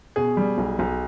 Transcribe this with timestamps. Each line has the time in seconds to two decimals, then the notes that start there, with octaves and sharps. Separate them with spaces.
0.16 B2 G#4
0.37 G3
0.58 B1
0.79 B1